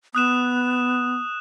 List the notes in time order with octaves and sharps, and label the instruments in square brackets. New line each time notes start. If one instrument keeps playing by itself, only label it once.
[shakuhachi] B3 [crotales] D#6 F#6 E7